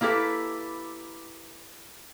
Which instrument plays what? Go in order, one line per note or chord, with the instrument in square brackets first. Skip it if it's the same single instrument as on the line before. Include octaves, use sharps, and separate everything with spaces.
[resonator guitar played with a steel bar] A#3 E4 G4 A4 B4